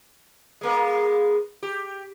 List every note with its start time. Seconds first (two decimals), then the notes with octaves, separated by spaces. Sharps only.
0.61 G#3 A#3 B3
1.63 G4